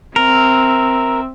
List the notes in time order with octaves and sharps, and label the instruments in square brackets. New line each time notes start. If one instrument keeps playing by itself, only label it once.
[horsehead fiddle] C4 E5 [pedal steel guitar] A#4